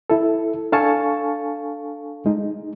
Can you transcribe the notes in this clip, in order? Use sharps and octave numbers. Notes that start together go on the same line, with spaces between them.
E4 A4
D4 A4 F5 G#5 A5 C#6
G#3 D#4